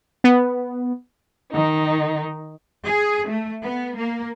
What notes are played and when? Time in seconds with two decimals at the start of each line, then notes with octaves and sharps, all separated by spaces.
0.24 B3
1.52 D#3 D#4
2.85 G#4
3.28 A3
3.62 B3
3.97 A#3